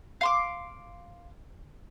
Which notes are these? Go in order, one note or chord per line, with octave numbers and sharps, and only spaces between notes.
F5 C6 D6